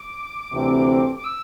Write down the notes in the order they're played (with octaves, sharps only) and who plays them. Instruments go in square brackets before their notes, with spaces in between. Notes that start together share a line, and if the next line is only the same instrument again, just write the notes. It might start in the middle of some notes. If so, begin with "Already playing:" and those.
Already playing: [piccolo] D6
[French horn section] D2 C3 E3 C4 A4
[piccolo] D6
E6